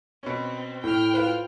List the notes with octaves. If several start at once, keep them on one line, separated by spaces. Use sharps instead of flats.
B2 C4 C#4
A2 G5 F6
F4 B4 C5